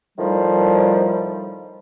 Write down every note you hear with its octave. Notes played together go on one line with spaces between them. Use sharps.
A2 D#3 F3 G3